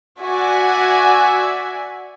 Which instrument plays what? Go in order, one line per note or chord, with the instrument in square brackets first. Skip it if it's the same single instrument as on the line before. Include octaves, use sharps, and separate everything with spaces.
[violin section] F#4 D5 E5 G#5